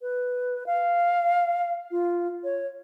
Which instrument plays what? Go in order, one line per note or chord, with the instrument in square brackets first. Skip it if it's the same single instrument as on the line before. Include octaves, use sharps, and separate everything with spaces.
[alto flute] B4
F5
F4
C#5